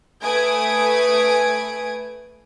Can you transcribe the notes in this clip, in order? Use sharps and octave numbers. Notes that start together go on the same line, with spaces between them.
A3 B4 G#5 D#6 G#6 D7